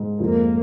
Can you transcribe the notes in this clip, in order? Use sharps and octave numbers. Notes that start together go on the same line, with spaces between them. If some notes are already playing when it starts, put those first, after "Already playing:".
Already playing: G#2
F2 A#3